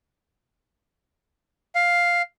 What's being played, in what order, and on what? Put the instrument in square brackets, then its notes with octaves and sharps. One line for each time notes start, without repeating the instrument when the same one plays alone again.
[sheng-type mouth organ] F5